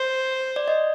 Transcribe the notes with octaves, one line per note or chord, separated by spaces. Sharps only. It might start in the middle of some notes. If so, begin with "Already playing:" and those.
Already playing: C5
D5
D#5